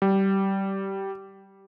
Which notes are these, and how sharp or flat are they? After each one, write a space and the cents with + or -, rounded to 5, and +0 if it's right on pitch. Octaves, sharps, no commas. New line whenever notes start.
G3 -15